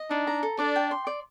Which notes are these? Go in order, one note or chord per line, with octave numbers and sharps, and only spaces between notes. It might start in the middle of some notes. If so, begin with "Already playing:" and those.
Already playing: D#5
D4 D#4
A#5
A4
D4 D5
G5
C6
D5